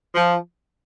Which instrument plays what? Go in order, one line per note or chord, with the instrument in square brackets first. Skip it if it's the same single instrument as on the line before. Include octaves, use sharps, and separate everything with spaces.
[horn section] F3